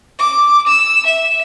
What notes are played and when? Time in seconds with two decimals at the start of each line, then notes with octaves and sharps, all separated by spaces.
0.19 D6
0.67 E6
1.06 E5